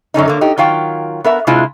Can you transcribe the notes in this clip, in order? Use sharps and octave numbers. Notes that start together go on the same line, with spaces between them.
F#2 D3 C#4 D#4
D3 A#3
D#4 G4
D#3 F#3 F4 F5 G5
B3 A#4 E5
C3 G#3 E4 F4